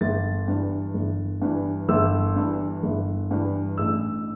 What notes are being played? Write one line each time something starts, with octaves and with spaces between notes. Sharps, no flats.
G1 A6
G2 E3
G1
G2 E3
G1 E6
G2
E3
G1
G2 E3
A1 E6